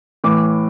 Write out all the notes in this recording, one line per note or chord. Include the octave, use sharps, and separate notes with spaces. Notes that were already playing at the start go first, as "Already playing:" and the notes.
A2 E3 D6